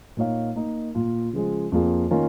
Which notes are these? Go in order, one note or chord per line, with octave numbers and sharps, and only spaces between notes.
A#2 A#3 D#4 C#5 F5
A#3 D#4 A#4
A#2 A#3 F4
C#3 F3 G#3 F4
F2 F3 A#3 F4 G#4
D#3 A#3 C#4 F4 A#4